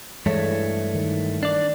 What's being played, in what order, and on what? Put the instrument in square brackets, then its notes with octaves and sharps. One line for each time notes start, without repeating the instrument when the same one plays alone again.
[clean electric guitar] G2 A3 [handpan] E3 G#3 C#5
[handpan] D#3
[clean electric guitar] D4 D5